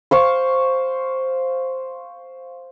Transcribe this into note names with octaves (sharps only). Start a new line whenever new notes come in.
C5 F5 C#6